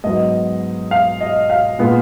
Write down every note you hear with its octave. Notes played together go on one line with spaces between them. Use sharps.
G#2 F#3 B3 D#5
F5
D#5
F5
A#2 G#3 B3